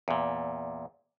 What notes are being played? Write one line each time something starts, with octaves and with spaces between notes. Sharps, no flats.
E2 A#2